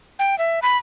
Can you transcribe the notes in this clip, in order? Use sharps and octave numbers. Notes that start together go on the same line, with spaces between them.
G5
E5
B5